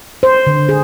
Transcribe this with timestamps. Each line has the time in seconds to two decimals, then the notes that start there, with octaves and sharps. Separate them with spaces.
0.23 C5
0.47 D3
0.69 G#4